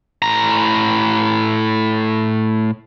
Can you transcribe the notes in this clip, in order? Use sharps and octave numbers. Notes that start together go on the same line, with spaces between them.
A2 A#5